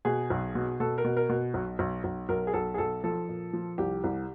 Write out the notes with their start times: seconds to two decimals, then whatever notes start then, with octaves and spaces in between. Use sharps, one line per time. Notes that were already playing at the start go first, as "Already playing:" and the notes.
0.05 B2 G#4
0.30 B1
0.55 B2
0.80 B2 A4
0.98 A#4
1.04 B2
1.17 A#4
1.29 B2
1.54 B1
1.79 B1
2.04 B1
2.29 B1 A#4
2.47 G#4
2.53 B1 A4
2.74 G#4
2.78 B1 A4
3.04 F3 A4
3.29 A#2
3.53 F3
3.78 C2 G4
4.04 C2